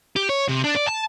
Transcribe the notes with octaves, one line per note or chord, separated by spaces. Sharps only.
G4
C#5
C3
D4
D5
A5